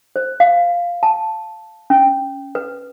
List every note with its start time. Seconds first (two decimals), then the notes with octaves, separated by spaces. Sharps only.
0.16 C5
0.40 F5
1.03 A5
1.90 C#4
2.55 B4